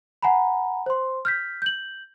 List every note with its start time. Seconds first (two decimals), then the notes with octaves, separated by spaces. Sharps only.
0.23 F#5 G#5 A#5 B5
0.86 C5 C6
1.25 F6 G6 B6
1.62 G6 F#7